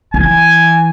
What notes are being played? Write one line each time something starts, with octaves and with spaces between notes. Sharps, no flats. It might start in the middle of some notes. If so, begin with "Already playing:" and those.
E3 G#5